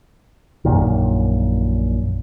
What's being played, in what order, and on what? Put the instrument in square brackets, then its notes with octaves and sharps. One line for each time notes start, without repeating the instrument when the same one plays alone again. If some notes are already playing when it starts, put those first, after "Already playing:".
[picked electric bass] A#1 F#2 A#2 D#3